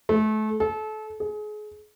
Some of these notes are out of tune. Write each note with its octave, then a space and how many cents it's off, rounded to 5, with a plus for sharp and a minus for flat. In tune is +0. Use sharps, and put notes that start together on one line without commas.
A3 -30
A4 -30
G#4 +30